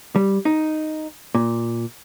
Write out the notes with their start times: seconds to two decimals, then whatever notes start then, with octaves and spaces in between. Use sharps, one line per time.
0.16 G3
0.45 D#4
1.35 A#2